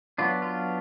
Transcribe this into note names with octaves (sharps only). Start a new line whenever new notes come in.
F#3 B3 D4 F4
F4